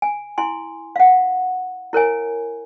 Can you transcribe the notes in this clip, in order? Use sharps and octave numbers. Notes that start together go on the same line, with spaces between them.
G#5
E4 G#5 C6
F5 F#5
E4 A#4 C#5 G#5